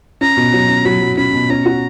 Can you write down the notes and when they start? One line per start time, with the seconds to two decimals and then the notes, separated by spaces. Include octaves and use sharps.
0.21 C#4 A#5
0.37 B2
0.53 F#3
0.69 C#4
0.85 F#3 B5
1.01 F#3
1.17 C#4 B5
1.33 B2
1.50 C#4 A#5
1.66 F#4